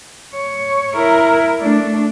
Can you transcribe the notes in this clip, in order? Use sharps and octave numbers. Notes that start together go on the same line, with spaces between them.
C#5
E4 A#4
A3 D4